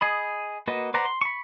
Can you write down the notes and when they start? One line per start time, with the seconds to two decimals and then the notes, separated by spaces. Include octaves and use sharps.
0.01 G#4 D#5 B5
0.67 A#3 F#4 B4 D#5
0.94 B4 C5 D5 F#5 A#5
1.05 C6
1.21 B5 C#6